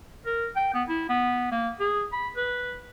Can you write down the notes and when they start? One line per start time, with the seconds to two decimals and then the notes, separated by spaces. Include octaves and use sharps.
0.26 A#4
0.56 G5
0.74 B3
0.89 E4
1.09 B3
1.51 A#3
1.80 G#4
2.13 B5
2.37 B4